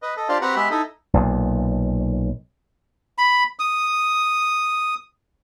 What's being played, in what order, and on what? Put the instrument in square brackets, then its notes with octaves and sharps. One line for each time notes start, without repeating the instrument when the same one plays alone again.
[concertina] B4 D#5
A4 D#5
D4 F4 G4 C5 D5 F5
C4 F#4 G4 B4 F#5 A#5
G#3 B3 G4 E5 B5
D#4 E4 A4 D#5
[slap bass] B1 A#2
[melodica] B5
D#6